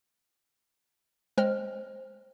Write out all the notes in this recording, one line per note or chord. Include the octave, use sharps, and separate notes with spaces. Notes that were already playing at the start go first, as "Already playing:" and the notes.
G#3 C5 G5 F6